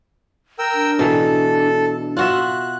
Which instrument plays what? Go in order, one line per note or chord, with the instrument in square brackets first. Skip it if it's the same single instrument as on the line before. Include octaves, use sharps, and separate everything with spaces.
[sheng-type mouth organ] A#4 G5 E6
[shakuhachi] D4
[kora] B2 E3 [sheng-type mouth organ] A4
[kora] F4 F#4 E5 [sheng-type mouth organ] F#6